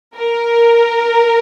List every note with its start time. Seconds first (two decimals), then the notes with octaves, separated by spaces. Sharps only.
0.17 A#4